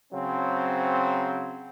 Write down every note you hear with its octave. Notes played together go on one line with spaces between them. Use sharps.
C#3 F#3 C4